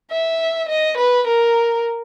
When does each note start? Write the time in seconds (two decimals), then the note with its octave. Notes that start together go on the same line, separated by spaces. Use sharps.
0.11 E5
0.69 D#5
0.97 B4
1.27 A#4